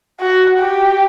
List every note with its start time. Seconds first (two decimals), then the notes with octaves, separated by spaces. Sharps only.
0.20 F#4
0.60 G4